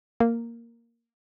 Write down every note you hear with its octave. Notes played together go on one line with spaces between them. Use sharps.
A#3